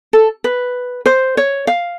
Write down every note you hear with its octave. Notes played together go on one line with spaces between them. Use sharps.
A4
B4
C5
C#5
F5